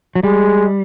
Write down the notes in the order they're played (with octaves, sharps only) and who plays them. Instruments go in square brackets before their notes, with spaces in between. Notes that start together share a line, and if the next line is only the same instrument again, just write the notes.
[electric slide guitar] F#3
[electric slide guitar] G3 [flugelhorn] G#3